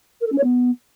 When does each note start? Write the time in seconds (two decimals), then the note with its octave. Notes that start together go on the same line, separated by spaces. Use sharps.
0.21 A#4
0.26 A4
0.32 C#4
0.38 C#5
0.43 B3